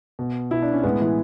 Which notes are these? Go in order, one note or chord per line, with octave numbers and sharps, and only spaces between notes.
B2
B2 E4
D4
C#4
A2 G#3 B3
E3